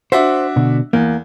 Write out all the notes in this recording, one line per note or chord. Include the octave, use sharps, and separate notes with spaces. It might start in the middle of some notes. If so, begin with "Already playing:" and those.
D4 F#4 C5 E5
B2 D3
E2 A#3